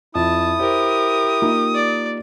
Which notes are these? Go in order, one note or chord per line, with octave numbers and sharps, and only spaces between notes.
F2 E4 A5 D#6
G4 A#4 C5
A#3 D#4 F4
D5